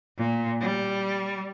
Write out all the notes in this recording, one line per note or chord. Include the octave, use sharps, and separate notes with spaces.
A#2
G3